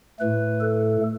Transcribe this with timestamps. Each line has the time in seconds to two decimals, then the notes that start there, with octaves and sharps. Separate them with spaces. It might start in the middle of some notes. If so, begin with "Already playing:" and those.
0.20 A2 A3 B4
0.61 A4